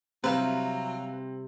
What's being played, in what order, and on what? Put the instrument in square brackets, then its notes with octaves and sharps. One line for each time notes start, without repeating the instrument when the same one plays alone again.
[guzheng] C3 G3 E4 [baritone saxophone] F#3 [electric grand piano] C4 [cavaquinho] B4 F5